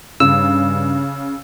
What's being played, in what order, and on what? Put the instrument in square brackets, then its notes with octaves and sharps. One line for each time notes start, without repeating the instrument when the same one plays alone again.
[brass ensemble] G2 [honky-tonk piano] C#3 [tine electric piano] E6